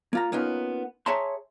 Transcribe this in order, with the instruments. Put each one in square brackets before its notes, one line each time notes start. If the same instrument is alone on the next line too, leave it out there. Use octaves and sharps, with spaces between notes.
[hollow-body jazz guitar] A#3 F4 A#5
A#3 B3 C#4 D#4 F4
G#4 C#5 E5 A5 A#5 C6